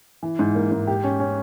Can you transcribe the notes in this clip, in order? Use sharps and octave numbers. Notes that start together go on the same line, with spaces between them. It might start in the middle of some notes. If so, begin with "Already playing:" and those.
E3
G#2
A#3
G#2
G4
C#4
C#4